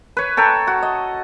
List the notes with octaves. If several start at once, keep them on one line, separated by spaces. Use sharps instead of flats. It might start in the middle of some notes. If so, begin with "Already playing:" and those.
B4 C#5
A4 C#5 G5 A#5
F#4
D#5